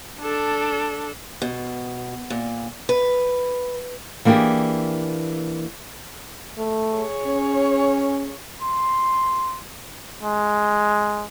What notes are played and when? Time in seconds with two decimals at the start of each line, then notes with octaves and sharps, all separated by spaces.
0.19 D4 A4
1.42 B2
2.30 A#2
2.89 B4
4.25 E3 A#3 B3 D4 G4 G#4
6.58 A3
6.95 G#4 C#5
7.27 C#4
8.62 C6
10.23 G#3